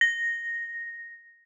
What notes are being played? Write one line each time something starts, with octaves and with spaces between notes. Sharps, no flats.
A#6